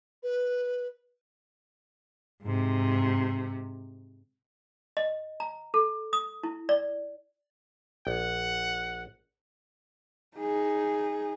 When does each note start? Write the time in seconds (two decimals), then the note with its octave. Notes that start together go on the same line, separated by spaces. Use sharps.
0.23 B4
2.43 G#2 C3
4.97 D#5
5.40 A#5
5.74 A4
6.13 D#6
6.43 E4
6.69 D5
8.07 A#1 F#5
10.37 D#4 G#4